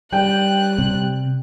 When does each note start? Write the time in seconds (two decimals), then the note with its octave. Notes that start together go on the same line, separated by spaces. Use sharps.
0.13 G3 G5 F#6
0.78 C3